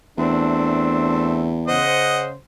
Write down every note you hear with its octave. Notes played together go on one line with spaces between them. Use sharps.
E2 A3 C4 D4
C#3 C5 D#5 F#5